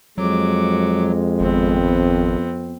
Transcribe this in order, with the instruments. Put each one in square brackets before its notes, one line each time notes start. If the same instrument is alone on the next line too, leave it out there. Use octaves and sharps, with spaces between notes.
[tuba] F2 [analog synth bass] F#3 [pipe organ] G#3 [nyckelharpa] F#4 D6
[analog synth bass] G#1 [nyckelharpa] B3 C4